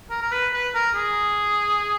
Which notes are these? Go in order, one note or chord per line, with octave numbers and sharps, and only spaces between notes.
A#4
A#4
B4
B4
A#4
G#4